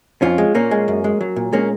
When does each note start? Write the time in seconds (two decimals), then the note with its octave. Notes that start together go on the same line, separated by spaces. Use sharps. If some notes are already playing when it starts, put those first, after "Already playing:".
0.22 F2 C#4 F4
0.38 G#3
0.55 A#2 A#3 C#4
0.71 G#3
0.88 F#2
1.04 G#3
1.21 F#3
1.36 A#2
1.53 G#3 A#3 C#4